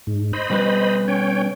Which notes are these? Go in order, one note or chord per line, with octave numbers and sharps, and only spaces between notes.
G#2
C5 D#5 B5
B2 G3 B4
C#4 C#5 G5